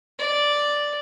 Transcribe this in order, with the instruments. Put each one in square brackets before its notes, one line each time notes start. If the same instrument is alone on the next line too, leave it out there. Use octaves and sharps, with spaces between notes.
[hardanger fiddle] D5